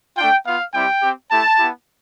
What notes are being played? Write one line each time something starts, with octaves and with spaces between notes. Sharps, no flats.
A3 D4 F4 G5
B3 F4 F5
G3 C4 E4 G4 G5
C4 G4
A3 E4 G4 A5
B3 E4 G4